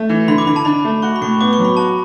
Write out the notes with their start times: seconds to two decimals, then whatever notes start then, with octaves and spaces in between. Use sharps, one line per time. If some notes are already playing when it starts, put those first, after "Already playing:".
Already playing: A3
0.09 E3
0.28 D3 B5
0.38 D6
0.47 D3 B5
0.56 A5
0.65 D4 B5
0.84 A3
1.02 F#4 C#6
1.16 B5
1.21 A2 C#6
1.41 B3 D6
1.53 C#6
1.59 F#3
1.65 B5
1.77 F#4 A5